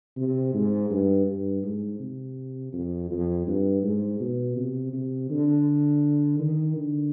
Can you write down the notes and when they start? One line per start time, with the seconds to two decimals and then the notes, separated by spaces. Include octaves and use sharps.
0.17 C3
0.54 G#2
0.91 G2
1.26 G2
1.63 G#2
2.00 C3
2.73 F2
3.11 F2
3.47 G2
3.83 G#2
4.20 B2
4.57 C3
4.93 C3
5.30 D3
6.39 D#3
6.76 D3